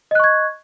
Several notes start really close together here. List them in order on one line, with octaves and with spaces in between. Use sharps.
D#5 F#6 C#6 G#6